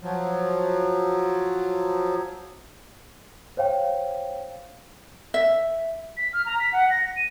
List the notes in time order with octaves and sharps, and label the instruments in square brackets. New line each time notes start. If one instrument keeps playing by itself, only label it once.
[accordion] F3 F#3
[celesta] C5 C#5 F5 G5
[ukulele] E5
[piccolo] B6
F6
A#5
B6
F#5
A#6
A#6
D#7